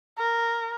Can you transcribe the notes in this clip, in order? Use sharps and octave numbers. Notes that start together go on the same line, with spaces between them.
A#4